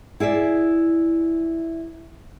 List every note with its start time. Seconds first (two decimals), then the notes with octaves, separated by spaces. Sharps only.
0.20 E4 G#4 D5 E5